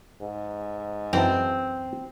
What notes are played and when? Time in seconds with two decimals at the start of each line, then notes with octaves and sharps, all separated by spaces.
0.22 G#2
1.13 F#2 E3 C4 A5